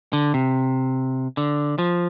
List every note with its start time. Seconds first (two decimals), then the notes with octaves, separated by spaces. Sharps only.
0.13 D3
0.34 C3
1.37 D3
1.79 F3